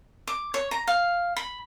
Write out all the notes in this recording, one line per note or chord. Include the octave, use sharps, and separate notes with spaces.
D6
C#5
A#5
F5
B5